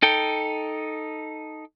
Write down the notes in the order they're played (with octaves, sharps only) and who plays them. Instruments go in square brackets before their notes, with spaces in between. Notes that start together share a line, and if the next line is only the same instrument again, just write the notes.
[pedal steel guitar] D#4 A4 G5